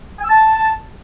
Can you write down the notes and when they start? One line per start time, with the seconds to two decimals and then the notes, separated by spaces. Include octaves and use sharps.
0.19 G#5
0.24 E6
0.30 A5